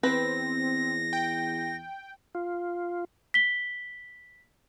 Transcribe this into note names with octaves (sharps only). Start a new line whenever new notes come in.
E2 C4 B4 A#6
G5
F4
B6 G7